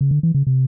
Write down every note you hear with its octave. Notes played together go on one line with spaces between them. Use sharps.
C#3
D3
E3
C#3
C3